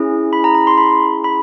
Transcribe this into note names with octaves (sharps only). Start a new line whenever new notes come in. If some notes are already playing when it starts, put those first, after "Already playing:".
Already playing: C#4 E4 G#4
B5
A#5
A#5
C6
B5
B5